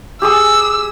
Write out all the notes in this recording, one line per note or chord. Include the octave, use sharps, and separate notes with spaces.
G4 G#4 D#6 E6